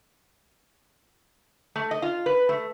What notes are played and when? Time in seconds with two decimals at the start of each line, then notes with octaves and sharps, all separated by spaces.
1.76 A3
1.91 D#5
2.02 F4
2.26 B4
2.49 A3